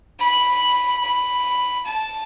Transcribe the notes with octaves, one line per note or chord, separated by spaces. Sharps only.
B5
B5
A5